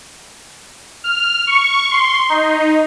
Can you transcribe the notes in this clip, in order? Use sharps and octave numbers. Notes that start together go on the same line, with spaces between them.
F6
C#6
C6
D#4